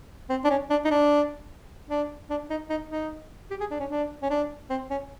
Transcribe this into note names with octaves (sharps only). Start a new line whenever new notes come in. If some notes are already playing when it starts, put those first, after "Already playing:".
C4
D4
C#4
D4
D#4
D4
D4
D4
D#4
D#4
D#4
G4
G#4
D4
C#4
D4
C#4
D4
C4
C#4